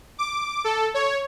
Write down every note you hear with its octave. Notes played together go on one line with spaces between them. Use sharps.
D6
A4
C#5